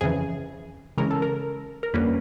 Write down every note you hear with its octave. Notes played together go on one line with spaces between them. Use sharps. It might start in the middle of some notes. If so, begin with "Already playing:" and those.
F2 C#3 E3 G#4
C#3 E3 G#3 C#4 A#4
A4
A#4
A#4
F2 D3 G3 A#3 C#4 B4